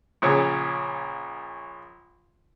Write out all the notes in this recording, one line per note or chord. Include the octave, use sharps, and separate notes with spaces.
A#1 A#2 C#3 C#5